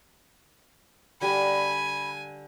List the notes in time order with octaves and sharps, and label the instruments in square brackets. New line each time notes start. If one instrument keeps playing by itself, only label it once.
[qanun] D3 G3 [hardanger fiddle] G#5 [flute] B5